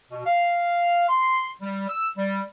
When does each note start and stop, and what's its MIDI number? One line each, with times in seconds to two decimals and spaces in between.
0.11 0.20 47
0.26 1.05 77
1.08 1.46 84
1.61 1.87 55
1.89 2.07 88
2.17 2.41 55